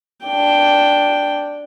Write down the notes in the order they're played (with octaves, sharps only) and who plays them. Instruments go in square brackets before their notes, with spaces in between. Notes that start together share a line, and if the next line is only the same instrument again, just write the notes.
[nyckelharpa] D4 G5